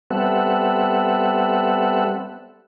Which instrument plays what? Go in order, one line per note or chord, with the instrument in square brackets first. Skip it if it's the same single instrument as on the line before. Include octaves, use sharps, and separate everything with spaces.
[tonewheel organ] G3 B3 C4 A4 E5 F#5